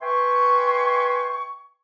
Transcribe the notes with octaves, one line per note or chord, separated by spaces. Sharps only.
B4 E5 G5 G#5 C6 C#6